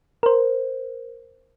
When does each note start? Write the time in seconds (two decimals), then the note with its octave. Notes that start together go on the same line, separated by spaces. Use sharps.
0.23 A#4 C5